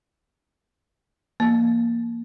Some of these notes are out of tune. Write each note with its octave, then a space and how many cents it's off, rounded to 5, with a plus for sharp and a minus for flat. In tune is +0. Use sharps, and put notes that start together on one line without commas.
E3 +45 A#3 +0